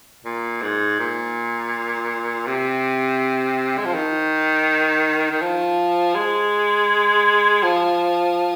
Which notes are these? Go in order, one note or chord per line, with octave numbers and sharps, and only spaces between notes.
A#2
G#2
A#2
C3
G#3
F3
D#3
D#3
F3
G#3
F3